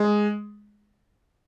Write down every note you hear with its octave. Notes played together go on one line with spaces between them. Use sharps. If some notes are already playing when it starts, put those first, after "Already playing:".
Already playing: G#3